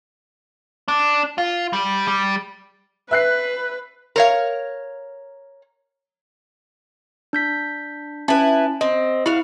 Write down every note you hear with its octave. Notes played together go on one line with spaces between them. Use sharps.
D4
F4
G3
G3
B4 E5 F#6 C7
A#4 C#5 F5
D4 G6 B6
C#4 E4 B4 A5
C4 D#5
E4 F#4 F5